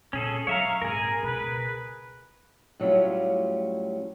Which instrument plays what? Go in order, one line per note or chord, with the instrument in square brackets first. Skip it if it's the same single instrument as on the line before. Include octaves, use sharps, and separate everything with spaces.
[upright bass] A#2 [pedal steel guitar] C#4 G#4 A4
[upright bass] F#3 [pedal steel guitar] C#5 E5 A#5 [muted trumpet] F5
[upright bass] G#1 A#2 [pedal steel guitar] G#4 A#4 [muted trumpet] G#5
[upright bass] C#2 B2 [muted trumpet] B4
[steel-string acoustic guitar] A2 F#3 G3 C#4 F4